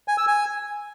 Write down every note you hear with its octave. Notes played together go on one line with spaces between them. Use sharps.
G#5
E6
G#5